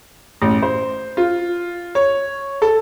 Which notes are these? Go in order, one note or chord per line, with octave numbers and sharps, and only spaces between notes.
A1
C5
F4
C#5
A4